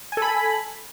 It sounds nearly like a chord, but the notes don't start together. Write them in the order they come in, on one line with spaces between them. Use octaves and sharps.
G#5 A4 B5